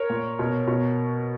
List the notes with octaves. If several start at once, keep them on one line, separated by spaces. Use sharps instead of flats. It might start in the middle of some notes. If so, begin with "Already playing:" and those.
Already playing: A#4 C#5
A#2
B2
B2